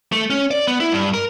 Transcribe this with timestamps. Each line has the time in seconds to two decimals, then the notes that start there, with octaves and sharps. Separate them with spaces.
0.12 A3
0.30 C#4
0.51 D5
0.67 B3
0.80 E4
0.92 G2
1.14 A#4